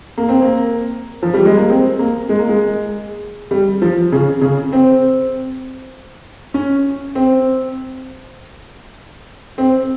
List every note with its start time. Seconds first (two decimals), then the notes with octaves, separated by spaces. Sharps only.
0.17 A#3
0.29 C4
0.42 A#3
1.23 F3
1.34 G3
1.45 G#3
1.57 A#3
1.69 C4
1.99 A#3
2.29 G#3
2.39 A#3
2.49 G#3
3.51 G3
3.82 F3
4.12 C#3
4.41 C#3
4.73 C4
6.54 C#4
7.15 C4
9.58 C4